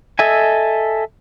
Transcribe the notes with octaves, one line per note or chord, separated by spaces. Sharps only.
A4 D#5 E5 G#5